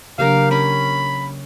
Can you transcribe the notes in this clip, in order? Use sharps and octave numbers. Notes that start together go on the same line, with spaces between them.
C#3 F#3 A#3 D4 G4 A#4 F5
C#4 B5